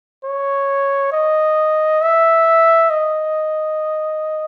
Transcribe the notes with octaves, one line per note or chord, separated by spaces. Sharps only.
C#5
D#5
E5
D#5